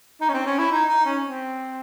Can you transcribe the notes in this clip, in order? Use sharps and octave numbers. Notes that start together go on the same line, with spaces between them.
D#4
C#4
C4
C#4
E4
D#4
D#4
C#4
C4